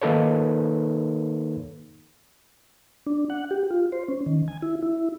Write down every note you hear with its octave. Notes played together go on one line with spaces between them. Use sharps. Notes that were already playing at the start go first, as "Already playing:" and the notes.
D#3 A#3 D#4 A4 B4 C#5
D4
F#5
G4
F4
C5
C#4
D#3
G#5
E4
E4